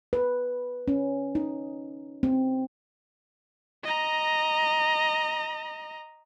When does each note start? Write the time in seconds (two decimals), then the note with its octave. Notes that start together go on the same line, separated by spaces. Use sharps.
0.13 B4
0.88 C#4
1.35 D#4
2.23 C4
3.83 D#5 A#5